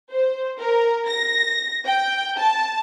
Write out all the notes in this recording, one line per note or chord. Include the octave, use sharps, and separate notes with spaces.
C5
A#4
A#6
G5
A5